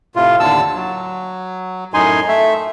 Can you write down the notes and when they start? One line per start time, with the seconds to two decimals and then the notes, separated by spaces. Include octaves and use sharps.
0.16 A2 C3 F4
0.40 D#2 A2 D3 A5 E6
0.75 F#3
1.94 F#2 A2 D#4 G#5 C6
2.28 A3 E5